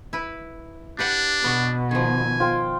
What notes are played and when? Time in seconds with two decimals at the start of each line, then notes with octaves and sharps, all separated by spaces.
0.13 E4 B4
0.99 D4 G4 B4 F#5
1.44 B2 B3 F#4
1.91 D#3 F3 G#5
2.40 F4 C5 G5